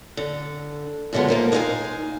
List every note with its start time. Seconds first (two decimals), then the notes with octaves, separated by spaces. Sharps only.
0.17 D3
1.13 F#2 B2 D3 G#3 B3 F4
1.28 F3 A#3 D#4
1.52 G#3 D#4 A4 C5 F5 G#5